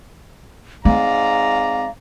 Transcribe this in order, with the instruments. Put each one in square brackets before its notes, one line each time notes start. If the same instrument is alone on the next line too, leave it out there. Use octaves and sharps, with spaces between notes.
[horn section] G#2 D5 A#5 [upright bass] C4 [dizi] F5